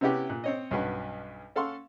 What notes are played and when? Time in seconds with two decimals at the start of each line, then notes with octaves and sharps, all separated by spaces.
0.01 C3 B3 C#4 E4 G4 B4
0.30 A#2 F#6
0.44 C4 C#5 D#5
0.71 B1 G2 C#4 F#4 B4
1.56 C#4 A4 F5 F#5 C6 C#6